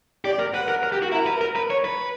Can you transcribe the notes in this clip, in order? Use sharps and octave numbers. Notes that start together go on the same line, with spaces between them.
G4 D5
A#4
B4 F#5
A#4
A#4
G4
F#4
E4 A#4
B4
A#4
B4
C#5
B4